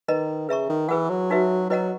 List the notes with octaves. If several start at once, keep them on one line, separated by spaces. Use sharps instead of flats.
D#3 B4 D#5 A#5
C#3 B4 E5 A#5 C#6
D#3
E3 G#4 B4 F#5
F#3
D#4 F#4 B4 E5
F#3 E4 B4 D#5 F#5 A#5